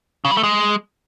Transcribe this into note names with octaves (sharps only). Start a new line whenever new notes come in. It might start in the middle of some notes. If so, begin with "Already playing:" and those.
C#3
G3
A3
G#3